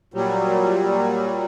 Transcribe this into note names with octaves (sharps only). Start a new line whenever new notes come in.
A#2 F#3 G3